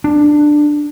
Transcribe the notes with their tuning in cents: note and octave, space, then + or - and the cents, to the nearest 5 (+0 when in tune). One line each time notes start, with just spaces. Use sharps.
D4 +15